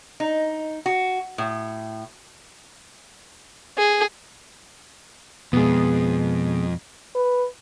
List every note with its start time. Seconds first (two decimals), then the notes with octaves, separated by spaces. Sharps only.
0.20 D#4
0.86 F#4
1.38 A2
3.77 G#4
5.53 F2 B2 G#3 B3 G#4
7.15 B4